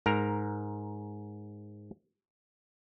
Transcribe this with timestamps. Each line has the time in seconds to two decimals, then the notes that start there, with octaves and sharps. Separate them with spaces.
0.06 G#2 A#4 A#5